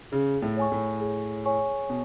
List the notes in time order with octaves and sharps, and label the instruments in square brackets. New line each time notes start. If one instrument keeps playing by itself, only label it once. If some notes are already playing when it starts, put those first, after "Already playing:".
[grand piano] C#3 [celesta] G#4
[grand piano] A2
[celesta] C#5 G#5 C#6
[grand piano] A2
[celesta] G#4
C#5 G#5 C#6
[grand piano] B2